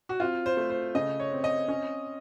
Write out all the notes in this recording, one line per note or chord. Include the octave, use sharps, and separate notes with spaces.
F#4
C4 F4
C5
A3
C5
C#3 D#5
C#5
C4
D#5
C#4